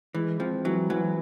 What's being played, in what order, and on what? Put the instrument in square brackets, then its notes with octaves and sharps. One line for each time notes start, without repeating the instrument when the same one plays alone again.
[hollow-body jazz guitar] E3 [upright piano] G#3
[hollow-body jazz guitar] F3 [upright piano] C4
[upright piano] E3 [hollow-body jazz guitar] F#3
[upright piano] E3 [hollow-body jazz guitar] F#3